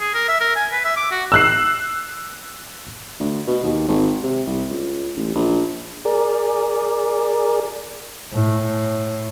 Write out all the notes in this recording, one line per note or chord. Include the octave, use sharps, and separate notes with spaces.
G#4
A#4
E5
A#4
G#5
B4
E5
D6
F#4
E6 F#6 C7
D2
B2
D#2
G#1
C3
C2
C#2
A1
A#1
G#4 A#4 D5
A2